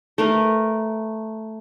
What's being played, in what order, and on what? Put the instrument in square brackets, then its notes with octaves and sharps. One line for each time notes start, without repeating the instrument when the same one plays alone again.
[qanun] A3 A#4 B4